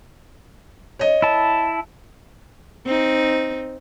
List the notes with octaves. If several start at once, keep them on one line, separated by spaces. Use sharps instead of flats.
C#5 D#5
E4 A5
C4 D#4